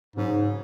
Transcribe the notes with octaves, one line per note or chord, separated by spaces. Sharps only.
G#2 C#3 F#3 C#4